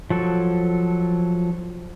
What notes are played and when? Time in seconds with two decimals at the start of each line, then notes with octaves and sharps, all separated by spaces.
0.10 F3 F#3 A4